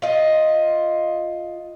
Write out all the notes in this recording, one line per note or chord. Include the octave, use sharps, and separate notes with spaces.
F4 D#5